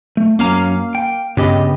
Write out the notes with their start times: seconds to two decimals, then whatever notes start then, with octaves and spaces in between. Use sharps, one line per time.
0.17 A3
0.39 F#2 A#3 C#4 F5 A#5
0.95 G5
1.37 G2 C#3 B3 G4 D#5